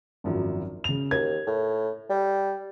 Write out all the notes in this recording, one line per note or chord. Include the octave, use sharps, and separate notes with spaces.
G#1 F#2 F3
C#3 F7
D#2 G#6
A2
G3